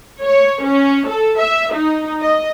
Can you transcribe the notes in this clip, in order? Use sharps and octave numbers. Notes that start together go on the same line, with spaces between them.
C#5
C#4
A4
E5
D#4
D#5